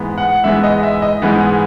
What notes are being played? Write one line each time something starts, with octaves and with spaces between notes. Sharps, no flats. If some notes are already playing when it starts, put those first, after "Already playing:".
Already playing: G#2 E3 G#3 B3
F#5
G#2 E3 G#3 B3 E5
D#5
E5
D#5
G#2 E3 G#3 B3